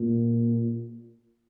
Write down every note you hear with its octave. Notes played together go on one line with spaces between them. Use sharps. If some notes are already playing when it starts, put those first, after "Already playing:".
Already playing: A#2